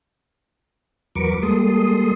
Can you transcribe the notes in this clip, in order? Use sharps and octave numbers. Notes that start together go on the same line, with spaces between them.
E2 F#3 A#4 B4 C#6 D6
G3 G#3 A#3 A4 C6 D#6